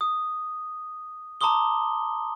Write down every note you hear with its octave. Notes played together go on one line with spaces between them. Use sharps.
D#6
A5 A#5 C6 D6 D#6 G7